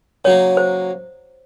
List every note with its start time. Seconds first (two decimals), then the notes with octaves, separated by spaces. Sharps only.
0.25 C#3 F#3 A#3 C#5
0.57 C5